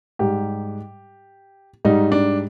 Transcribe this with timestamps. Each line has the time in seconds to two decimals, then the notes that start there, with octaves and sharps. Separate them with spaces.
0.19 G#2 G3 G4
1.85 G#2 G3 D#4
2.12 D4